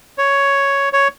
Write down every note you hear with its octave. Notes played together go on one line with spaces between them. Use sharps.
C#5
C#5